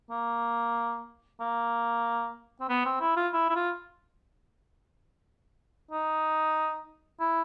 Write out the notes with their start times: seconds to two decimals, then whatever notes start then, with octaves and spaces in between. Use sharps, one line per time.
0.10 A#3
1.40 A#3
2.61 C4
2.69 B3
2.85 C4
3.01 E4
3.17 F4
3.33 E4
3.50 E4
3.55 F4
5.91 D#4
7.20 E4